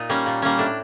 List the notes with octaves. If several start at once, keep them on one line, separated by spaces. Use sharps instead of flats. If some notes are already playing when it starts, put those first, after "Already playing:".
Already playing: A#2 D#4
G3 A#3 C#4
A#2
G3 A#3 C#4
A2 D4